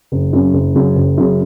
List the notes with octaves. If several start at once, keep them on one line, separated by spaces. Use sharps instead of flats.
F#1
F#2 C#3
F#1
F#2 C#3
F#1
F#2 C#3